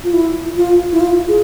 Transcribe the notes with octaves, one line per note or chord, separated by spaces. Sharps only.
F4
E4
F4
E4
F4
G#4